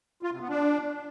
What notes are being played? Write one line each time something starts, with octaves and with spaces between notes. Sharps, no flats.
F4
C3
B3
D4